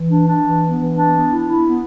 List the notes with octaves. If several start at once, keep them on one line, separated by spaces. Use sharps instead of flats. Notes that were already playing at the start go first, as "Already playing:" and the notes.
Already playing: E3
D4
D4
E3
B3
E3
D4
B3
E4
E4
B3